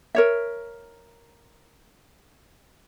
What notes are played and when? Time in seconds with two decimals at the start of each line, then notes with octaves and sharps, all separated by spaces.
0.15 A#4 C#5 E5